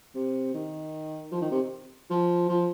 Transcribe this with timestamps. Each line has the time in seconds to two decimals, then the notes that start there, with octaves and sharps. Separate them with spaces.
0.15 C3
0.54 D#3
1.32 F3
1.41 D#3
1.51 C3
2.10 F3
2.48 F3